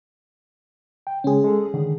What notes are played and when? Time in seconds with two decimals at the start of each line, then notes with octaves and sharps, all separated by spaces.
1.07 G5
1.24 C#3 G#3 C#4 G#4
1.44 G#3 A4
1.74 D3 D#3